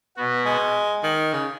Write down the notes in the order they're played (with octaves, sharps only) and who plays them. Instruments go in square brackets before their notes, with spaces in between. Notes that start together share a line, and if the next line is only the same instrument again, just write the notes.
[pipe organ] B2 B3 F#4
[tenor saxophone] G#3
D#3
C#3